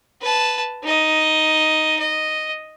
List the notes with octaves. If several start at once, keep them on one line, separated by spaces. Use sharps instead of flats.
B4 A5
D#4 D#5
D#5